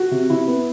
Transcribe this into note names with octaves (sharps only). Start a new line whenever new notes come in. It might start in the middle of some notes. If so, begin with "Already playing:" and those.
Already playing: F#4
C3
C3 E4
B3